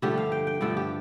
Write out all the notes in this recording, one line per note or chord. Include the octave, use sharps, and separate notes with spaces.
G2 D3 F3 A3 G4
F5
G5
G5
G2 D3 F3 A3 A4
G4